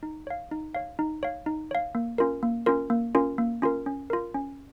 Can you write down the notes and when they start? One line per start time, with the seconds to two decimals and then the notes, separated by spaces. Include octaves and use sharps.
0.03 D#4
0.27 C#5 F5
0.51 D#4
0.75 C#5 F5
0.99 D#4
1.23 C#5 F5
1.46 D#4
1.71 C#5 F5
1.95 A#3
2.18 C#4 F4 A#4
2.43 A#3
2.66 C#4 F4 A#4
2.90 A#3
3.15 C#4 F4 A#4
3.38 A#3
3.62 C#4 F4 A#4
3.86 C#4
4.10 F4 A#4
4.34 C#4